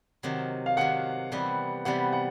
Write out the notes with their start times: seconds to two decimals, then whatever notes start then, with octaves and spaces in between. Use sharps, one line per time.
0.23 C3 D#3 F#3
0.66 F5
0.77 C3 D#3 F#3 F#5
1.32 C3 E3 G3 B3
1.85 C3 E3 G3 B3 F#5
2.13 F#5